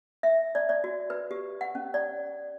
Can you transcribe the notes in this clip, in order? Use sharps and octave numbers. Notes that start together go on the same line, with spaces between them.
E5
D5
D5
F#4
B4
G4
F#5
C#4
D5